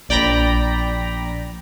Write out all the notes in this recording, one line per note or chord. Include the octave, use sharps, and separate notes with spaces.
A#1 D5 G5 A#5 B5 A#6